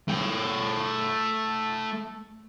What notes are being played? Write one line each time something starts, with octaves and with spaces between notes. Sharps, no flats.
A3 G5